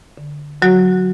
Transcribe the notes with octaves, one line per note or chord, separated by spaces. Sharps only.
D3
D3 F#3 F#4